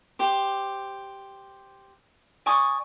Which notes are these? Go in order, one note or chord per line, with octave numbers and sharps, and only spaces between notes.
G4 C5
D5 G#5 C#6 D#6